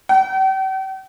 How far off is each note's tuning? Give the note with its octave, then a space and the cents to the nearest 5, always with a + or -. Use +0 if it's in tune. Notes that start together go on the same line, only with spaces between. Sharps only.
G5 -45